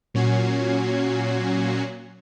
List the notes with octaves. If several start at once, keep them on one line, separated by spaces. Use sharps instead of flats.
A#2 F#3 C#4 F#4 G#6 C7